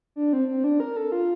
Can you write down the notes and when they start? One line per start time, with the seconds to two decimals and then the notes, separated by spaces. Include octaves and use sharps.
0.16 D4
0.33 C4
0.48 C4
0.64 D4
0.80 A#4
0.97 A4
1.12 F4